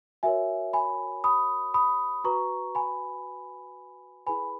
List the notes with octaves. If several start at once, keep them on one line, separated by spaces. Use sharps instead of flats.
F#4 A#4 C#5 E5 G#5
G#5 B5
B5 D#6
B5 D#6
F#4 B4 A#5 C#6
G#5 B5
E4 G#4 B4 G#5 B5